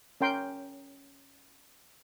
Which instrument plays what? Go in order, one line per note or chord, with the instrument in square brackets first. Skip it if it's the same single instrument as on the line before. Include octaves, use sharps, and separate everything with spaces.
[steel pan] C#4 A#4 G5 C6